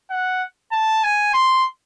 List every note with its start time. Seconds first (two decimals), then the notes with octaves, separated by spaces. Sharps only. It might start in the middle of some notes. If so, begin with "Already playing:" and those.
0.10 F#5
0.72 A5
1.04 G#5
1.34 C6